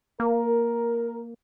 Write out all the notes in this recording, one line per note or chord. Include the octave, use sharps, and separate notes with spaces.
A#3 A#4